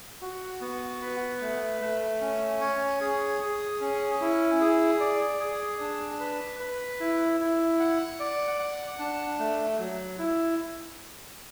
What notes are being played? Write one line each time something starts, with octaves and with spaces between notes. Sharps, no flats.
F#4
B3
B4
A3
A3
C#4
C#5
G#4
G#4
C#4
E4
G#4
D5
G#4
D4
B4
B4
E4
E4
F#5
D5
F#5
D4
A3
F#3
E4